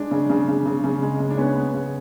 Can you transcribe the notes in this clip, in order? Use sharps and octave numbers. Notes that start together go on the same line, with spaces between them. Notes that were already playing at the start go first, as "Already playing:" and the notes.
Already playing: G#3 D4
C#3
C#3
C#3
C#3
C#3
G#3
C#3
D4
B3 C#4
B3
C#3